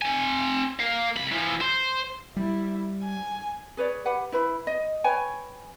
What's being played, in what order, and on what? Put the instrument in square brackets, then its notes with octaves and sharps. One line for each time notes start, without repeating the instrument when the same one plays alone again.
[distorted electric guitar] C4 G#5
A#4 F5
C2 B5
E3 F3
C5
[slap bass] G3 [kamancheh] E4
[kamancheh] G#5
[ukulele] G#4 B4 C#5 D5
G4 B4 F#5
E4 B4 B5
D#5
B4 C#5 G5 G#5